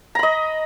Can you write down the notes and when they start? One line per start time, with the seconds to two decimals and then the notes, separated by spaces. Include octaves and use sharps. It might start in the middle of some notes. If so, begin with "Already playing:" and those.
0.15 A#5
0.19 B5
0.23 D#5